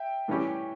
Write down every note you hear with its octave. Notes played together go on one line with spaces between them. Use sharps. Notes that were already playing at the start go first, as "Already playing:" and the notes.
Already playing: E5 G5
A2 E3 G3 C#4 G4